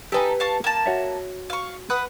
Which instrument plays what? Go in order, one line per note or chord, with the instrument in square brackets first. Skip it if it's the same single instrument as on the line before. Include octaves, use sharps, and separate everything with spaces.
[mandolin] D#4 A4 [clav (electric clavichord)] G4 B4 G#5
[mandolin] F5 A5 C#6
A#3 A5
[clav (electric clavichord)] F#4 C#5 E5
[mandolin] F5 C#6
B4 F#5 D#6